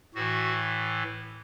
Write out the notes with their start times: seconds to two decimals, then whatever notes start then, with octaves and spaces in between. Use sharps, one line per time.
0.15 A2 E3 F#4